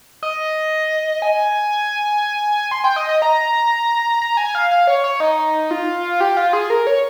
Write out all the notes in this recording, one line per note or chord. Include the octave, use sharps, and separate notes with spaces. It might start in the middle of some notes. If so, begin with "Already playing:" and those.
D#5
G#5
C6
G5
D#5
D#5
A#5
A#5
G#5
F5
F5
C#5
C#5
D#4
F4
G4
F4
G#4
A#4
C#5